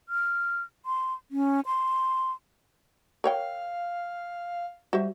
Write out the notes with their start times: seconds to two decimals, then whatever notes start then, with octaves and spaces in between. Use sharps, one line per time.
0.09 F6
0.86 C6
1.31 C#4
1.66 C6
3.24 A#4 C#5 F5 G5
4.93 G3 F#4 C5 E5